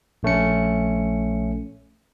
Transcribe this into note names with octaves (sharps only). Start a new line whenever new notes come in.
A#1 A3 C#4 C#7